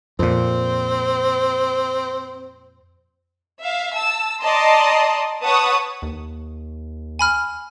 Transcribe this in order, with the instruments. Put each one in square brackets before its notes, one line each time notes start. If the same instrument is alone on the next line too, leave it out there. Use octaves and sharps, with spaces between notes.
[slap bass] F2 A#2 [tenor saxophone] C4
[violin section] E5 F5
A5 E6
D5 D#5 A5 A#5 C6
B4 C#5 F#5 A5 C#6 D#6
[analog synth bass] D#2
[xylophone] G#5 B5 F6